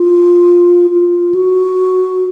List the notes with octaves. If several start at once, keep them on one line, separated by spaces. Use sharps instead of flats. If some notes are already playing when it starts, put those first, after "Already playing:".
Already playing: F4
F4
F#4